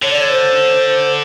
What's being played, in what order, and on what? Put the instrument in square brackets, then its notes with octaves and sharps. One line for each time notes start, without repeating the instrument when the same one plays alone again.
[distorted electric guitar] D3 [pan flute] C#5
[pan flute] D5
C#5
C5